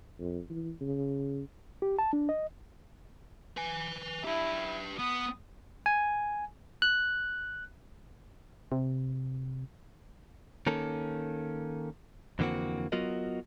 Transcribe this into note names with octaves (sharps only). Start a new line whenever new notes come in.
F2
E3
C#3
G4
A5
D4
D#5
B4 G#5
E4 G4 B4
B3 D#6
G#5
F#6
C3
D#3 A#3 C#4 A4
F2 D3 E3 A#3 C4 F#4
F#3 B3 F4 F#4 A#4 D#5